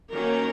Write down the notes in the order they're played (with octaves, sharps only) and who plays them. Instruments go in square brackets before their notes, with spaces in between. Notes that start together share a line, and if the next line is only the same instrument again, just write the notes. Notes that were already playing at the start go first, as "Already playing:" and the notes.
[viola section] D#3 F#3 A#3 C#4 A#4